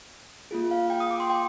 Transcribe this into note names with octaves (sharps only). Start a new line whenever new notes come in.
A#3 F4 G#4
F5
G5
D#6
D6
C6
G5